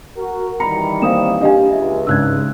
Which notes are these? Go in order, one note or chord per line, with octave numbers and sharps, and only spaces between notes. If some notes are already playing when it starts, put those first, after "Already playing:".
F#4 A#4
D#3 E3 G3 A#5 B5 C#7
A#3 C4 F5 D#6 E7
D4 G4 D#5 F5 G#5
C#2 E5
G#2 C#3 D4 E6 F#6 G#6